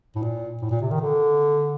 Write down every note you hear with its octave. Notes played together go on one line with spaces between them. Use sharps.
A2
A#2
A2
A#2
C3
D#3
D3